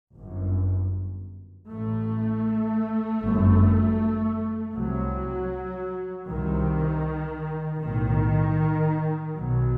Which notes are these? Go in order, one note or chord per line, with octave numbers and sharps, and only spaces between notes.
G1 F#2
A1 A2 A3
G1 F#2
C2 C3 F#3
C2 C3 D#3
B1 A2 D#3
B1 B2 F#3